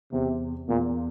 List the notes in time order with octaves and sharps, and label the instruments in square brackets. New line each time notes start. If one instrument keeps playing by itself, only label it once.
[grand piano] E2 [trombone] C3
[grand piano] E2 [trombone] A#2